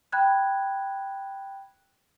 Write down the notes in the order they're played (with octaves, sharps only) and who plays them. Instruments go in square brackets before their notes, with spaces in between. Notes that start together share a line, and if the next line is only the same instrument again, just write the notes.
[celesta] G5 B5 F#6 G#6